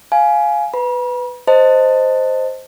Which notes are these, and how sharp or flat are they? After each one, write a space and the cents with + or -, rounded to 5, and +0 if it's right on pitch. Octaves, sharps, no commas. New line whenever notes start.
F5 +0 G#5 +15
B4 +10 B5 -45
C5 +0 D#5 +0 A5 +25